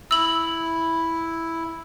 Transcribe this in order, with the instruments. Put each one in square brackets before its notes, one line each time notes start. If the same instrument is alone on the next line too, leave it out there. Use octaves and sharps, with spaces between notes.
[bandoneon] E4 [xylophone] E6 F#7